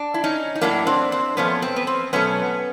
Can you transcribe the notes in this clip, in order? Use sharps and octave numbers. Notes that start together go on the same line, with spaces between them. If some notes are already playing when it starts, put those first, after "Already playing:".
Already playing: D4
E4
C#4 D#4
D#4
A2 F#3 A#3 D4 E4
C4 D4
C4
A#2 F3 A3 B3 C#4
C4
B3
C4
B2 F#3 A3 B3 C#4